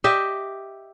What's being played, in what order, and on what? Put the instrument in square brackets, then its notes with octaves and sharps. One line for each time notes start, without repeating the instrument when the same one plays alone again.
[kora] G4 D#5 E5